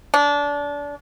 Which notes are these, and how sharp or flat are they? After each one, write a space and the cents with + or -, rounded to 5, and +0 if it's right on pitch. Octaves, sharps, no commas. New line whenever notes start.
D4 -25